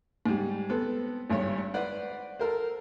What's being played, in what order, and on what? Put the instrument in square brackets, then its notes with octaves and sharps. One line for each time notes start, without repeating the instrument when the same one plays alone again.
[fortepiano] G#2 G3
B3 C4 A4
G#1 G2 C#5
B4 C5 D5 F#5
A4 A#4 C5